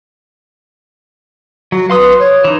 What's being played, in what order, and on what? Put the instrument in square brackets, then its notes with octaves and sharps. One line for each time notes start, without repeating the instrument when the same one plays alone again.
[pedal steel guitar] F#3 [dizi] F#4
[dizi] B4 [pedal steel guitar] F5 C6 D#6
[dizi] C#5
[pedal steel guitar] E3 D#4